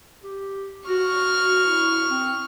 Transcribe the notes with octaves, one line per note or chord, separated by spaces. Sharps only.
G4
F#4 C#6 F6
E4
C4